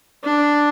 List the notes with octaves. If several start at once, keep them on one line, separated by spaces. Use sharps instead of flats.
D4